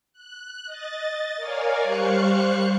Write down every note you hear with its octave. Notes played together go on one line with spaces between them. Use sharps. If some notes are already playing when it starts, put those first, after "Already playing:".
F#6
D#5 A6
A#4 C#5 D5 F5 G#5
G3 C5 F5 C#6 F#6 C#7